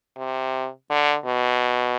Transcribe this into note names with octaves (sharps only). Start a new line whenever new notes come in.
C3
D3
B2